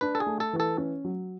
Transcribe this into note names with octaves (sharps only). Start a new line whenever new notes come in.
D4 B4
A4
G#4
A3
A4
E3
A4
C#4
F#3